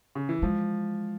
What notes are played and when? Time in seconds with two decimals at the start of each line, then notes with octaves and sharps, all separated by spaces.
0.15 C#3
0.29 E3
0.42 F3 G#3